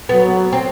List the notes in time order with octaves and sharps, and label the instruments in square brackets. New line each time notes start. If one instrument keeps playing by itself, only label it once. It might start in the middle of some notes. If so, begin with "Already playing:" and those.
[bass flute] F#3 [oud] B3
[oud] C4